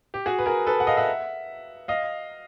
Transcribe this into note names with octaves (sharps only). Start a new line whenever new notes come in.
G4
F#4 G#4
B4
G#4 A#4
A4 B4
F#5
D#5 F5
E5 F#5
D#5 F5